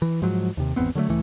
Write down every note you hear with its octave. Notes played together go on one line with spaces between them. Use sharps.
E3
G#2 F3 F#3
D#2 C3
G#1 E2 B3 C4
D3 F#3 G#3 A3
C#2 A2 E3 A3